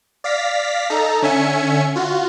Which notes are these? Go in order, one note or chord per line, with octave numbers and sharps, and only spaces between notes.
D5 F5 A#6 B6
D#4 A4 A#5
D3 C#4 E5 G#5 C#7
F4 F#4